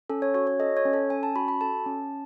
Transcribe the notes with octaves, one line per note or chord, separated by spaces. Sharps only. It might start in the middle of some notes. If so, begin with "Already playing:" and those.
C#4 A4
C#5
F#4 C#5
C#5
A4 D#5
C#5
C#4
A4
C#4 G#5
A5
F#4 B5
B5
A4 A5
C#4